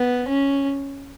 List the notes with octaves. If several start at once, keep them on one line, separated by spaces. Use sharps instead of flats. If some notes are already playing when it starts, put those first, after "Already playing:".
Already playing: B3
C#4